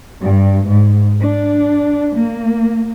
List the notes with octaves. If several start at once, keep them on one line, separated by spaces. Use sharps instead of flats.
G2
G#2
D4
A#3